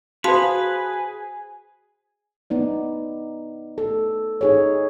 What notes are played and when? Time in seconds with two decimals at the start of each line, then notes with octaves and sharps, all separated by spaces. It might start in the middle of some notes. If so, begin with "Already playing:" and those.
0.24 F#4 G#4 B4 C5 F5 A5 C6
2.50 B3 D#4 D5
3.78 A4
4.41 D#4 G#4 C#5